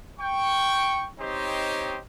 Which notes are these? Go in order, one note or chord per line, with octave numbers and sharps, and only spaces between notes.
G5 C#6
C4 D#4 G4 C5 C#5 D#5